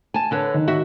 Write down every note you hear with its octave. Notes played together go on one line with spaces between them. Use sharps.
G#5 A5
D3 B4 C#5
D#3
F#4 E5